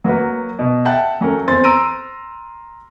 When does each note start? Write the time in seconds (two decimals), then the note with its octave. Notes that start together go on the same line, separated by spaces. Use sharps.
0.04 F#3 A#3 F#4 B4
0.59 B2
0.85 E5 F#5 G5 A5 F#6
1.21 F#3 C#4 A4 A#4
1.47 E2 C4 C6 A6
1.64 A#5 C6 E6 A#6 D7 D#7